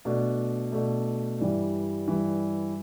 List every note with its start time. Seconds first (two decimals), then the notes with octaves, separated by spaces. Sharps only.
0.05 B2 A3 D4
0.72 B2 A3 D4
1.40 G2 E3 G3
2.08 G2 E3 G3